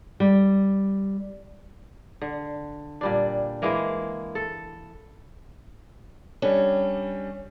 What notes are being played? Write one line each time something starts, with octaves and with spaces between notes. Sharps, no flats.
G3
D3
A#2 G3 D4
E3 G#3 A#3 A#4
A4
G3 C#4 D4